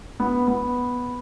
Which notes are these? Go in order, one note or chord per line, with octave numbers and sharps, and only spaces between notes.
B3
B3